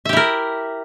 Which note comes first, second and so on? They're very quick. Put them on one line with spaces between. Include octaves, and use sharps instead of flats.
E5 G4 E4 A#4